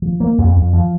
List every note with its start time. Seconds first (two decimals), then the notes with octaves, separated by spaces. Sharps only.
0.02 F3
0.20 A#3
0.38 F2
0.56 F2
0.73 F3